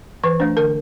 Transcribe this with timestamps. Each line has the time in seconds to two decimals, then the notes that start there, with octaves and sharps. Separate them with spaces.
0.24 E3 B4
0.40 A3 D4 C5
0.57 D3 A#4